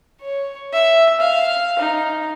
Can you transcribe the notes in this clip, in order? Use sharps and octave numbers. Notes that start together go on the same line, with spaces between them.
C#5
E5
F5
D#4